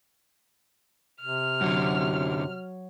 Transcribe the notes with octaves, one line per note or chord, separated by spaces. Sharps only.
C3 F6
F#2 D3 F#3